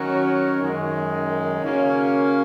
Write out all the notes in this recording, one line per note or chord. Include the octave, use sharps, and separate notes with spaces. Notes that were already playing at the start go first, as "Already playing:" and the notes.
Already playing: D#3 F#3 C#4 F#4 A#4
F#2 D#3 G#3
C#3 A#3 C#4 F#4 A#4